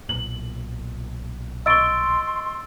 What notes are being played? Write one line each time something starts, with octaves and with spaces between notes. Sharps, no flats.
B1 A#2 F#7
D#5 C6 C#6 E6 A6 D7 G7